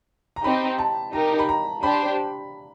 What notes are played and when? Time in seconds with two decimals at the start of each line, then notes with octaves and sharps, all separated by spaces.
0.36 A#5
0.44 C4 D#4 G4 B5
0.78 A5
1.13 D#4 G4 A#4 A#5
1.39 B5
1.49 A#5
1.83 D4 G4 C5 B5